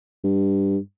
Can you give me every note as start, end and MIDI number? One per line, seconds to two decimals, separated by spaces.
0.24 0.78 43